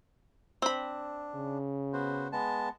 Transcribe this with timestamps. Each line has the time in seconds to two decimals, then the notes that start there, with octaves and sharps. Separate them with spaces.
0.62 C4 D4 B5
1.35 C#3
1.93 B3 F#4 C5
2.32 G#3 B3 A5